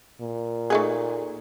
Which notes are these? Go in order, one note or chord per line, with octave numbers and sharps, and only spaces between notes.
A#2
A3 D#4 G#4